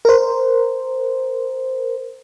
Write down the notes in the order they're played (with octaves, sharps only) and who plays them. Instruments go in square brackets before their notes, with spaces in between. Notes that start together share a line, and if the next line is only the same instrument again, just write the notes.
[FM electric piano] A#4 C5